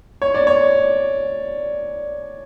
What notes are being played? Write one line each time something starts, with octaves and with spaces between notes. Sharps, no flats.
C#5
D5
C#5